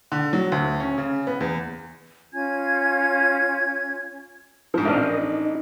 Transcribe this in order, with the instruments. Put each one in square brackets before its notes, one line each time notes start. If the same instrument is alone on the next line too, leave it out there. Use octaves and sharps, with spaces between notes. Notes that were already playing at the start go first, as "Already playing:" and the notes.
[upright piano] D3
F#3
D2
C#4
C#3
B3
E2
[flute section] C#4 F4 G#5 G#6
[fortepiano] G#2 F3
[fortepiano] A1 C4 D4 [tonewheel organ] D#5 F5
[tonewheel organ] A#4 D#5
D#4